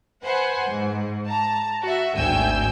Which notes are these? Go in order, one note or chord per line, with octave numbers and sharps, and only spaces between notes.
B4 C5 F#5 G#5
G#2
A5 A#5
F#4 E5
G#1 D2 G5 G#5 E6 G6